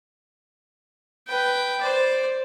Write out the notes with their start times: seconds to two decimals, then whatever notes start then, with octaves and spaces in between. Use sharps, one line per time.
1.27 B4 G5
1.81 C5 D5